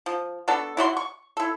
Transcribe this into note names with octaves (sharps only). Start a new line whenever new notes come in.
F3
B3 D4 F#4 A4
E4 F#4 D5 C6
C#6
E4 A4